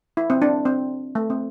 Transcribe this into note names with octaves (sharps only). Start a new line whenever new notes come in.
E4
C4
D4
C4
A3
C4